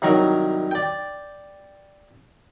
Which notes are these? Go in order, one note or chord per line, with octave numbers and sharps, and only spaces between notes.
C2 D#3 F#3 A#4
D5 G5